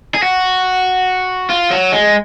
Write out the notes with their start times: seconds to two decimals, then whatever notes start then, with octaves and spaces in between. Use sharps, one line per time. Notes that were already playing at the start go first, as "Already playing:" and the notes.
0.15 G#4
0.23 F#4
1.50 F4
1.70 F#3
1.92 G#3